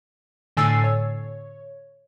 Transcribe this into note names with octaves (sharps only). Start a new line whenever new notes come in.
A2 D3 G#5 E6 A6 C7
C#5